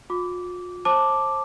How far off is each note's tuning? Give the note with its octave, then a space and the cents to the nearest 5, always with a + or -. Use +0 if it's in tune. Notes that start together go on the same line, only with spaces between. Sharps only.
F4 +45 D6 -15
C5 +35 A5 +0 D6 +0